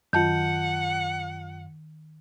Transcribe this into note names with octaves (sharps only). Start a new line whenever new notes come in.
F#2 D#3 F4 F#5 A5 G6